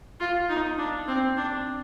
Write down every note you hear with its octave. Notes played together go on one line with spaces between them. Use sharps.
F4
D#4
D4
C4
D4